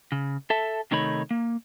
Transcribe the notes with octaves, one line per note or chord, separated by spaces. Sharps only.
C#3
A4 E5 A5
C3 D#3 A3 D#4 C#5 B5
A#3